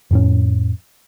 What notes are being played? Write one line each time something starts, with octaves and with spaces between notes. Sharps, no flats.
F2 A2 C#4